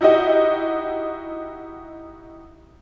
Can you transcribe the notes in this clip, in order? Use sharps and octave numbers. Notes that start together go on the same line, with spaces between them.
D#4 E4 F#4 G4 D#5